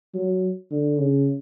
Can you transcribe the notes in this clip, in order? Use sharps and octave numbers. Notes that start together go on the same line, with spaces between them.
F#3
D3
C#3